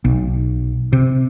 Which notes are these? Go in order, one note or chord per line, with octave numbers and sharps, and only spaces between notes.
B1
C3